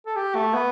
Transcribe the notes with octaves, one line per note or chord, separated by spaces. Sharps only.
A4
G4
A3
B3